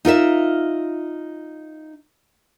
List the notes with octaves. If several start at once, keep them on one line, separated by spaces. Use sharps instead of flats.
D#4 F4 A#4 E5